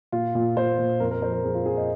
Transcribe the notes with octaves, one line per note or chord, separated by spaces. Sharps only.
A#2 F4
A#2
A#2 C5
A#2
F2 A#4
A#4
F3 C5
A#4
F2 G#4
F4
F2 G#4
D#5